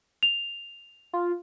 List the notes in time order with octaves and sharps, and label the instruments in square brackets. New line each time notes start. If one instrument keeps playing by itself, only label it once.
[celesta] F7
[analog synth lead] F4